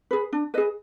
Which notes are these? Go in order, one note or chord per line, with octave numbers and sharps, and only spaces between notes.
G#4 B4
D4
G#4 B4 D#5